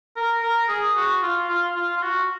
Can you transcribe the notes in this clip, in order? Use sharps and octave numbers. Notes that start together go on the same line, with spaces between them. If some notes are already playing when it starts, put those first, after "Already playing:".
A#4
A#4
G#4
F#4
F4
F4
F4
F4
F#4